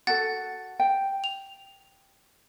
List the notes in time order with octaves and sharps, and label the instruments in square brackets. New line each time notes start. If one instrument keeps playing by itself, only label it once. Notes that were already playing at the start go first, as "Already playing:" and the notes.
[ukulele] F#4 A4 [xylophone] F#5 A6
[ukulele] G5
[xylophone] F7